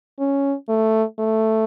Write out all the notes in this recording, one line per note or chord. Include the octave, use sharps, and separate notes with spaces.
C#4
A3
A3